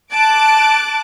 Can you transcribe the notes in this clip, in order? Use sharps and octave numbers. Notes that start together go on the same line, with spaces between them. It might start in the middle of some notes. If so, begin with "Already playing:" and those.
A5 D6 F#6 D7